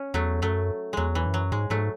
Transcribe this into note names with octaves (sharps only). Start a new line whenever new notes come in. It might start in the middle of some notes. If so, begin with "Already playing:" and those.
Already playing: C#4
E2 F#3 A3
F#2 F#3 A3
E2 F#3 G#3
E3
F#2
F#3
G#2 G#3
G#2 F#3 A3